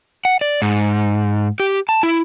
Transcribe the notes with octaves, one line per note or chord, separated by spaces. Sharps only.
F#5
D5
G#2
G4
A5
E4